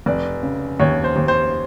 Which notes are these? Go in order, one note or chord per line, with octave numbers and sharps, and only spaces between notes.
F1 D5
C#3
D#2 C#5
C5
D#2
C5